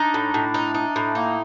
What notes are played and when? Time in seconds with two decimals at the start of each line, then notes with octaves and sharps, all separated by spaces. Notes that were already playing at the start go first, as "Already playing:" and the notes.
Already playing: D4 D#4
0.14 A2
0.34 A2
0.54 D#4
0.75 D#4
0.96 A2
1.15 A#3 D#4